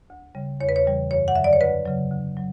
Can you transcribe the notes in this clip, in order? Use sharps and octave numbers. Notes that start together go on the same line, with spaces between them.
D2
C#3 G3
E2 C#5
B4
C#5
C#3 E3 G3
F#2 C#5
F#5
D3 F#3 E5
D5
C#5
D2 B4
C#3 F#3
D2
F#3